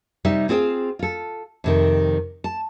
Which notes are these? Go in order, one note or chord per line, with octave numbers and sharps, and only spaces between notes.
C3 G3 D#4 G4 E5
C4 F4 G#4 C5 G5
F4 A4
F2 C3 D#3
A5